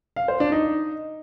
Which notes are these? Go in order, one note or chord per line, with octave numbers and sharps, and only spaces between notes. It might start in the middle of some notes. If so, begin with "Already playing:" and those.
F5
C5
D4
D#4